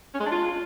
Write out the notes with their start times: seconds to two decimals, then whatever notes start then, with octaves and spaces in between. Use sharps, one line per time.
0.14 C#4
0.20 G#3
0.26 D4
0.31 F4